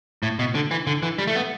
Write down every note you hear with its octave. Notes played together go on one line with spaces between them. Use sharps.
A2
B2
D3
E3
D3
E3
G3
A3
B3